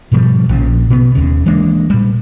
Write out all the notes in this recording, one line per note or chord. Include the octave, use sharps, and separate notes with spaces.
G#2 B2 F3 G3
A#1 A#2 C#3 F3
B2 B3
D#1 D#2 C#3
E3 G#3 A#3 D4
A#2 G3